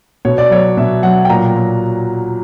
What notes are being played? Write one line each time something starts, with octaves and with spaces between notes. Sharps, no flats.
B2 C#5
D5
F#3 C#5
B2 E5
F#3 F#5
G5
A#2 A#5
F#3